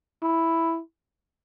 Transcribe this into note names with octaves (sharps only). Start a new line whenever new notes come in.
E4